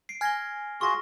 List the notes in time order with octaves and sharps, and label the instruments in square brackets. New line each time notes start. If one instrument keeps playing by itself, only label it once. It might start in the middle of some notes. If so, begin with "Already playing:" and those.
[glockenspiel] C7 D7
[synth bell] G#5 G#6 [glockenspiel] F6 A#6 G7
[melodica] F4 F#4 G#4 [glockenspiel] C#6 A#6